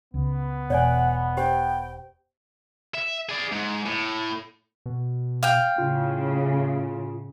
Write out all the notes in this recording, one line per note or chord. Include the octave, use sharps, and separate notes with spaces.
C#2 B3
E1 B2 C#5 D5 F#5 G#5
G4 C5 G5
E5
G#4 D5
G#2
A2
B2
F5 G5
A2 C#3 F4